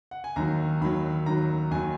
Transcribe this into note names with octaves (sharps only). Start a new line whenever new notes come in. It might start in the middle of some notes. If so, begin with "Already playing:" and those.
F#5
G#5
D#2 D#3 F#3 A#5
D#2 D#3 F#3 B5
D#2 D#3 F#3 A#5
D#2 D#3 F#3 G#5